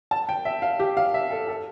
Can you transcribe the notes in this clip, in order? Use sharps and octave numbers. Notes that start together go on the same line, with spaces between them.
A5
G5
E5
F5
G4
F5
E5
A4
A4